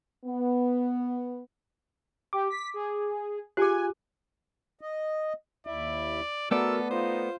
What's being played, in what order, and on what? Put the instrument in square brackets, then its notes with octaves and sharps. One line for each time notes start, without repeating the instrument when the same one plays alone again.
[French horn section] B3
[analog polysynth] G4 [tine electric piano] D6
[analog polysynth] B6
G#4
[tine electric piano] F4 F#6 [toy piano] G4 G#4 [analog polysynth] G#5
[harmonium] D#5
[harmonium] D#2 E4 E5 [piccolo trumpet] D5
[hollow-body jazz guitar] A3 B3 D5 [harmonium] F#4 A#4 [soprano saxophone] A4 [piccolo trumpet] E6
[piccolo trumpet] D#4 [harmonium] F4 [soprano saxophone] C5